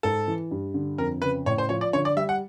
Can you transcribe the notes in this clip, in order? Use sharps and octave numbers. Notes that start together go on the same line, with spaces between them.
G#2 A4
E3
G2
D3
F2 A#4
C#3 B4
A2 C#5
C5
F3 C#5
D5
D3 C#5
D5
G3 E5
F#5